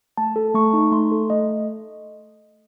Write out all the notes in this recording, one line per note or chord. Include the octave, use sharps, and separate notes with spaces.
A3 A5
A4
A3 C#6
D#4
A3 C6
A4
A3 D#5